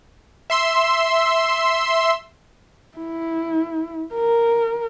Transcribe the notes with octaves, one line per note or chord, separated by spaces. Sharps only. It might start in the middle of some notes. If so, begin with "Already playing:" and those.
E5 C6 E6
E4
A#4